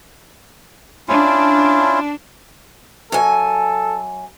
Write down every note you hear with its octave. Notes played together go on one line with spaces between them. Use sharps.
C#4 D4 E4 F4
F#2 A4 G#5